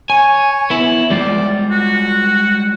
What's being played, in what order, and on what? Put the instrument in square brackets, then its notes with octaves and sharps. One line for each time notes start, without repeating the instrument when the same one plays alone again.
[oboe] C#5 [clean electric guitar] G#5
[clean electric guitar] B3 E4
[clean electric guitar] G3 G#3 F4 [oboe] D5
[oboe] F#4